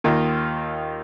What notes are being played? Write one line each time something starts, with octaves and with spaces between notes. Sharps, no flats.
D#2 D#3 A#3 F4